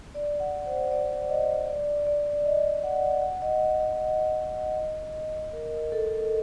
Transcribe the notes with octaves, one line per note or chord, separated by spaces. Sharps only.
D5
F#5
C5
D5
D#5
D5
D5
D#5
F#5
F#5
D#5
D#5
A#4
A4